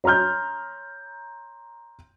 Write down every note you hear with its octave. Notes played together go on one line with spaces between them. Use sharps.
C#5 A#5 C6 F6 G6